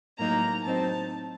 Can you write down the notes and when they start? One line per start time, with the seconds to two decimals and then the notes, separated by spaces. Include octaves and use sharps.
0.18 A2 F#3 A#3 D#4 A#5
0.64 A2 F#3 C4 D#4 A5